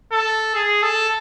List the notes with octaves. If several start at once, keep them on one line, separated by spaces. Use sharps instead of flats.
A4
G#4
A4